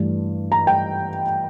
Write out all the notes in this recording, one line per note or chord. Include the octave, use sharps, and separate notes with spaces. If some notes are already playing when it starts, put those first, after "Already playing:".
Already playing: G2 E3 A3 D4
A#5
G5